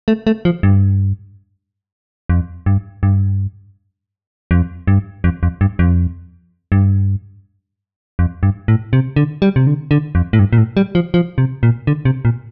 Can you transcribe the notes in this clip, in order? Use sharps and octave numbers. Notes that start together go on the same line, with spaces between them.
A3
A3
F3
G2
F2
G2
G2
F2
G2
F2
F2
G2
F2
G2
F2
G2
A2
C3
D3
G3
C3
D3
D3
F2
A2
G2
A#2
A2
G3
F3
F3
C3
A#2
D3
C3
A#2